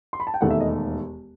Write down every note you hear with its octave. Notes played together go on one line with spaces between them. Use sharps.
C6
B5
A5
G5
E1 D#2 D#3 A3 F#5
E5
D#5